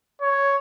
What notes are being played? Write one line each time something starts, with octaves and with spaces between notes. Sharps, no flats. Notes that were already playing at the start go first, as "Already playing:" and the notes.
C#5